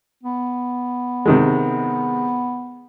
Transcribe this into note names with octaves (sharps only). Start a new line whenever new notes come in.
B3
C3 D#3 G#3